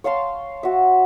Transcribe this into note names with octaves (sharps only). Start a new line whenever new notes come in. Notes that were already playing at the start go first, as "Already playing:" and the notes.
C#5 F5 A5 C6
F#4 E5